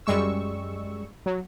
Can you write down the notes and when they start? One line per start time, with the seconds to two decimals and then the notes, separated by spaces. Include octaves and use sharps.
0.06 F#2 G3 G#3 C#6 E6
1.26 F#3